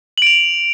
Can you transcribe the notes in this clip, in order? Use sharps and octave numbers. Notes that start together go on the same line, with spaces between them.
D7 F7 F#7